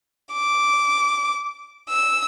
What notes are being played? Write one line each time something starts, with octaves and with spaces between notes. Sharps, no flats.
D6
E6